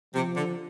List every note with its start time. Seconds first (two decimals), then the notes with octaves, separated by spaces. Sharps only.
0.15 C3 F3
0.36 D3